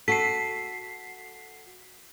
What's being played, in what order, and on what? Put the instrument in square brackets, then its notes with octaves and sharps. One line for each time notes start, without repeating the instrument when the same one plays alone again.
[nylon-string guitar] F#4 A4 [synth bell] B6 C7